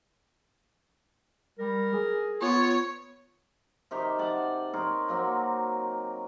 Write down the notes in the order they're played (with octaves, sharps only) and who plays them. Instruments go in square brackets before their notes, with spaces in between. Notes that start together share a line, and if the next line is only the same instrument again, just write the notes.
[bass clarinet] G3 [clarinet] A#4
[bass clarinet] G#4
[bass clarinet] B3 [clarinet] F4 [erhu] C#5
[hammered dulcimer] C3 D#3 G4
D5 F#5 A5
D#4 A#4 C#5 C6
F#3 A#3 C4